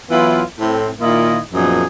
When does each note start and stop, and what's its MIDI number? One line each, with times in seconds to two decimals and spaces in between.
0.11 0.43 52
0.11 0.43 54
0.11 0.43 59
0.11 0.43 64
0.11 0.43 65
0.59 0.89 45
0.59 0.89 60
1.01 1.39 46
1.01 1.39 51
1.01 1.39 58
1.01 1.39 64
1.01 1.39 65
1.01 1.39 75
1.54 1.84 42
1.54 1.84 46
1.54 1.84 53
1.54 1.84 59
1.54 1.84 63
1.54 1.84 68